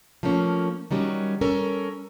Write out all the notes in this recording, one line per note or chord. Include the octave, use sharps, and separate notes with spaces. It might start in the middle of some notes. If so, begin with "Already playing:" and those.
F3 A3 A#3 C#4
D#3 F#3 G3 C#4
C#4 A4 A#4